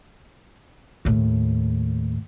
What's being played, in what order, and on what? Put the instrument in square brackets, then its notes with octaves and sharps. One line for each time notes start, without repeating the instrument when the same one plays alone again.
[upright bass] D#2 A2